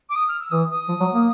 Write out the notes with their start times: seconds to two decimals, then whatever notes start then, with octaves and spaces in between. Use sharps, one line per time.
0.09 D6
0.15 D#6
0.28 F6
0.40 E6
0.51 E3 D#6
0.70 D#6
0.89 F3
1.00 F#3
1.13 A#3